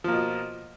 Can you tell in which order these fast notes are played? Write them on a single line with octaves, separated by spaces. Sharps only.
F3 A#3 B2